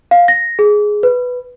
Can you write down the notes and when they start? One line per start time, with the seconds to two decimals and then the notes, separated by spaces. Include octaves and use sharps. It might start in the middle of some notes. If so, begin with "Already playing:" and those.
0.11 F5
0.28 A#6
0.59 G#4
1.03 B4